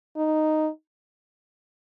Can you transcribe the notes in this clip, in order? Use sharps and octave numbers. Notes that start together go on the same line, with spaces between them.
D#4